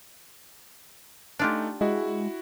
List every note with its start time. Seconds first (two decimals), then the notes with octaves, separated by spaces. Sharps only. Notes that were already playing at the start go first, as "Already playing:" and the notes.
1.39 A3 D4 D#4 F4 G4 G#5
1.81 G#3 E4 F#4